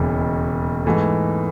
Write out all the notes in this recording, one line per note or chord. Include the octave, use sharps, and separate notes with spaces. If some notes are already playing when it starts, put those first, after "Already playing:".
Already playing: E1 D#2 C#3 E3
G#2 E3 A3